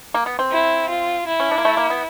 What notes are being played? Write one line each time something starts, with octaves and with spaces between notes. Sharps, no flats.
A#3
B3
C4
E4
F4
E4
C#4
D4
A#3
A3
A#3
B3